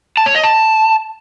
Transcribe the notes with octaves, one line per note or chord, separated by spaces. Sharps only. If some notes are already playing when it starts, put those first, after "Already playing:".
A5
C#5
D#5
A5